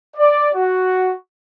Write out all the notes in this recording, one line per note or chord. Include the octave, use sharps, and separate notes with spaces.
D5
F#4